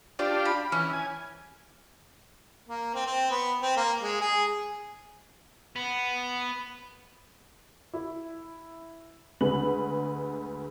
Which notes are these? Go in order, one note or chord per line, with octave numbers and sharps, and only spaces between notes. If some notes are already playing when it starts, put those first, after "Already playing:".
D4 F4 G4 D5
B5
E3 C#4
G#5
A#3
C4
C4
B3
C4
A#3
G#3
G#4
B3
E4
D2 G#3 B4 F#7